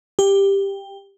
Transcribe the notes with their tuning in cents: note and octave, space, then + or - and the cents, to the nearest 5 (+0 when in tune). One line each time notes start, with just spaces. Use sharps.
G4 +10